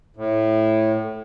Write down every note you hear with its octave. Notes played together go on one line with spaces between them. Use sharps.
A2